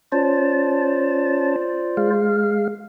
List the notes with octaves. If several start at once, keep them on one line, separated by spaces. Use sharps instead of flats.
C#4 F4 C5 D5 A5
G#3 F5